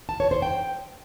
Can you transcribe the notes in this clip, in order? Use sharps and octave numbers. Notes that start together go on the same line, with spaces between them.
A5
C#5
C5
G5